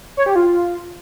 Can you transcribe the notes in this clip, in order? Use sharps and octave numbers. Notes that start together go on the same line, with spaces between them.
C#5
G4
F4